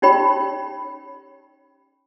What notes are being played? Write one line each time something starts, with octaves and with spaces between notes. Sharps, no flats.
C#4 D#4 G4 C#5 G5 B5